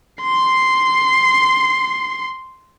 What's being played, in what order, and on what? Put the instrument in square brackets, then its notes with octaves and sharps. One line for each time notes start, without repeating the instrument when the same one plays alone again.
[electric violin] C6 C7